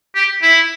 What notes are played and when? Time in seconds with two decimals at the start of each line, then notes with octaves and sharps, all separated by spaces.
0.15 G4
0.43 E4